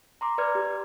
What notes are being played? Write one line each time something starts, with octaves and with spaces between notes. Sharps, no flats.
A#5 C6 D6
B4 D5 F6 G#6
G4